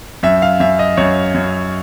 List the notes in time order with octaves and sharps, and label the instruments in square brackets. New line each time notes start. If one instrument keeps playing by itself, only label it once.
[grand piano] F#2 E5
F5
F#2 E5
D#5
F#2 C#5
F#2